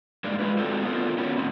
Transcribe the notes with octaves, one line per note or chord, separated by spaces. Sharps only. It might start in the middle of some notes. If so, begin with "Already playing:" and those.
G2 G#3 A#3 D4
G#3 F4 B4
G#3 C4 D4 F#4 A4 C5
B3 D4 F4 A4 A#4
B3 C#4 F#4
A2 C4